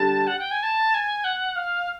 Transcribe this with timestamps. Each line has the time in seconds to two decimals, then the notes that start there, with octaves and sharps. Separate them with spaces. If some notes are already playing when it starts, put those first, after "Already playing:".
Already playing: D3 G3 A5
0.27 F#5
0.39 G5
0.51 G#5
0.63 A5
0.94 G#5
1.24 F#5
1.56 F5